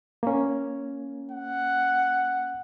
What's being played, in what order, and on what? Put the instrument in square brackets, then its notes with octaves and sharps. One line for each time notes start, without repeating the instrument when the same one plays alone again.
[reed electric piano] A#3 C#4
[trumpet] F#5